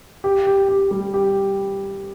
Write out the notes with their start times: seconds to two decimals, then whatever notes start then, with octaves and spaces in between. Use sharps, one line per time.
0.24 G4
0.47 G4
0.69 G4
0.91 G3
1.14 G4